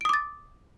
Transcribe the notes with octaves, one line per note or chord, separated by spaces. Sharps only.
D6 D#6 A6 D7